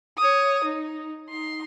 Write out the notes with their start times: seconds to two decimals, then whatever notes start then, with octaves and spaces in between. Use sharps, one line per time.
0.18 C#5 D#6
0.65 D#4
1.29 D#4 C6